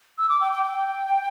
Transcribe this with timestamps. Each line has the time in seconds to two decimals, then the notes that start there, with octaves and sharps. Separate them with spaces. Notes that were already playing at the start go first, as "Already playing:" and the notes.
0.18 E6
0.29 D6
0.41 G5
0.52 G5
0.63 G5